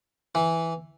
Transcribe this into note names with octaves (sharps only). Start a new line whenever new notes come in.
E3